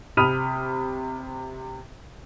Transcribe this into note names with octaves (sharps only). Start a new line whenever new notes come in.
C3 B5 D#6 F6 D#7 F7